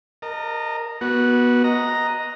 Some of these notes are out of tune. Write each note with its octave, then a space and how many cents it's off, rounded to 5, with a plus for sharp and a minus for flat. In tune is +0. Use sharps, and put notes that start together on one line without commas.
A#4 +0 D#5 -20 A5 +35
B3 -20 F#4 +0
D#5 +0 A#5 +0